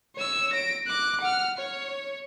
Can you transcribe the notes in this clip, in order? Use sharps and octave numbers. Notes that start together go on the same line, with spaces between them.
C#5 E6
A#6 D7
D6 F#6
F#5 F6
C#5